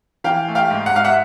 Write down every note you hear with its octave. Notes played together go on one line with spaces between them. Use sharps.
E3 F5 G5
A3
F5 G5
G#2
F#5
G#2 F5
E5 F#5